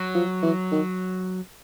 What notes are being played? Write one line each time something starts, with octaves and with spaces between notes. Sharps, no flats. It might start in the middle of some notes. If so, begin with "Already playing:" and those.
Already playing: F#3
F3
E3
D#3